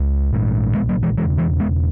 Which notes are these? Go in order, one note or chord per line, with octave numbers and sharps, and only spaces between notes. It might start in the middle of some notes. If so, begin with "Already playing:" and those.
Already playing: C#2
A#1 G#2
G#3 B3
F#3 A#3
E3 G#3
E1 E2 C#3 E3 G#3
E3 G#3
G#3 B3